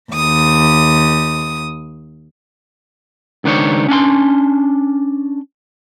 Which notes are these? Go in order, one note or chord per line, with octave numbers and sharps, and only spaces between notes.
D#2 D#6
C#2 D#3 D4 C5 C#5
C#4 D4 F#5 C6